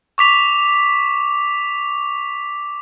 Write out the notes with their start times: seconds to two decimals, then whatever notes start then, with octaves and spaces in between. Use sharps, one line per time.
0.18 C#6 D6 B6 F7